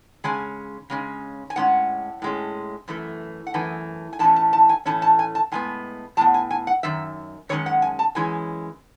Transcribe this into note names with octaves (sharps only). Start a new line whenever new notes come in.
C#3 G#3 C#4 G#5
C#3 G#3 C#4
G#5
A2 G#3 C#4 F#5
A2 G#3 C#4
F#2 E3 A3
F#5
F#2 E3 A3 G#5
G#5
A2 E3 A3 C#4 A5
A5
A5
G#5
A2 E3 A3 C#4 A5
A5
G#5
A5
A2 G#3 B3 G#5
A2 G#3 B3 A5
G#5
G#5
F#5
F#2 D#3 E5
F#2 D#3 G#3 C#4 C#5
F#5
G#5
A5
F#2 E3 G#3 C#4 G#5